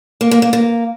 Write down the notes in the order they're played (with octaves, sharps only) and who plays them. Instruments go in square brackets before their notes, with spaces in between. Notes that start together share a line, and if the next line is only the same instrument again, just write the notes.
[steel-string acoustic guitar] A#3
A#3
A#3
A#3